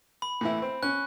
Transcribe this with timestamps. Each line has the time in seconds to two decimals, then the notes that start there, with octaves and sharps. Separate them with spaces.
0.22 B5
0.41 A2 E3 E4
0.62 C4
0.83 C#4 F#6